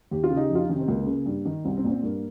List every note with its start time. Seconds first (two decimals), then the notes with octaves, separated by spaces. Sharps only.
0.11 D#2 G4
0.24 F4
0.30 C#3
0.36 D#4 G4
0.49 F2
0.55 F4
0.63 D#4
0.69 C3 D#3 C#4
0.80 C4
0.88 C#2 A#3
1.07 C#3
1.26 G2
1.45 D#3
1.65 C2 C4
1.77 C4
1.84 A#2
1.90 C4
2.03 G2 A#3